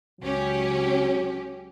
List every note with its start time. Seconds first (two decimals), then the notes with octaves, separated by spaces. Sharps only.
0.21 C#2 F#3 C#4 G4